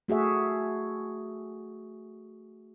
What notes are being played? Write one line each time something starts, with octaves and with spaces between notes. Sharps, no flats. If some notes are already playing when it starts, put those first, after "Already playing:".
A3 F#4 G#4 E5